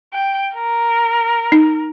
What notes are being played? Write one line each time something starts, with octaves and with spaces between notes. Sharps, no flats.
G5
A#4
D#4